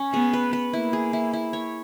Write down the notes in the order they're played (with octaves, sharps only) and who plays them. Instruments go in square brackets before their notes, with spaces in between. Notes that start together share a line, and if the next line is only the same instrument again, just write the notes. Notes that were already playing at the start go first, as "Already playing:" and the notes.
Already playing: [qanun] C#4
[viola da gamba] B3 [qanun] G#4
[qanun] B4
B4
[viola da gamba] A#3 [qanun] E4
[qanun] G#4
E4
E4
C#5